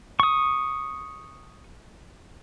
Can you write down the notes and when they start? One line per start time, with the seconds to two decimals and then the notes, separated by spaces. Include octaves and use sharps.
0.20 C#6 D#6